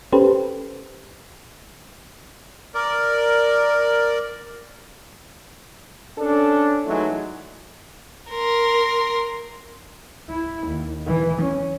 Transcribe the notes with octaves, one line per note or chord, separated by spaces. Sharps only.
C#4 G4 A4 B4 C5
A#4 D5
C#4 D4 A4
E3 F#3 G#3 A3 D#4 E4
A#4 C6
E4
D#2
E3
C#4